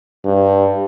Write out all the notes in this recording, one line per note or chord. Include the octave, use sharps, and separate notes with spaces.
G2